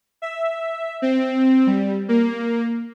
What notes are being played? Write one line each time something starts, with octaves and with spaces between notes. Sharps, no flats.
E5
C4
G3
A#3